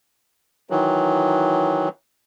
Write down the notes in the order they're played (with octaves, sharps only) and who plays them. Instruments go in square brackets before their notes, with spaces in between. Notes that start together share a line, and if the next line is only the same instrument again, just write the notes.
[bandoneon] D#3 E3 F#3